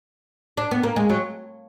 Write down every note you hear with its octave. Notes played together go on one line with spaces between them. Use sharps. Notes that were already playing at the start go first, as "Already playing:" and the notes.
D4
B3
A#3
G#3
F#3